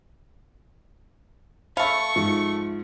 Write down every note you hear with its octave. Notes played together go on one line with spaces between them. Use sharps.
A3 F5 B5 C#6
G#2 F3